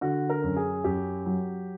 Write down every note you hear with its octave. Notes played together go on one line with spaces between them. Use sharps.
D3 F#4
A#4
F#2
G#4
F#2 G4
F#3